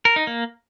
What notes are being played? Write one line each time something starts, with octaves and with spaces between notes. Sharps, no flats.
A#4
D#4
A#3